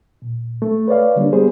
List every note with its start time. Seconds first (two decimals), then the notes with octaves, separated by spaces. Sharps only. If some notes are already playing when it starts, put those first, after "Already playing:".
0.22 A#2
0.62 A3 A4
0.88 B4 C#5 D5 F5
1.16 D3 G3 A#3 D4
1.33 G3 B3 G4 G#4 C5